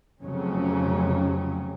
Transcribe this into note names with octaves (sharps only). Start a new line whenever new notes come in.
F1 F2 C#3 F#3 C#4